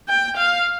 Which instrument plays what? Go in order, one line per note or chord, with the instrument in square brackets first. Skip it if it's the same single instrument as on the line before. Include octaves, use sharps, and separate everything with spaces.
[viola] G5
F5